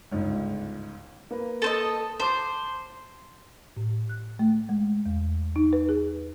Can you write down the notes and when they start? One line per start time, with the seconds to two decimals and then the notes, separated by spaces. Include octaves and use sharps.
0.11 G1 C#2 G#2
1.31 A#3 B4
1.62 A4 C5 D#5
2.20 C5 A5 D6
3.77 A2
4.09 F#6
4.39 A3
4.69 G#3
5.06 E2
5.56 D#4
5.73 B4
5.89 G#4